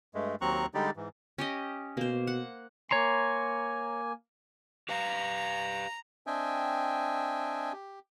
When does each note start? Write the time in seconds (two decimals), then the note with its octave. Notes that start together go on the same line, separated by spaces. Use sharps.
0.15 G2 G#3 A3
0.41 D#2 F#3 C4 A#5 C#6 F#6
0.74 D3 G3 G#3 D#4 G4 D5
0.96 G#2 E3
1.38 C#4 G4 D#5
1.97 B2 A#3 C5
2.27 F#5
2.91 A#3 C#5 G#5 A#5 C6
4.89 G4 B4 F5 A#5
6.27 C4 D4 D#5 E5 G5 G#5
7.73 G4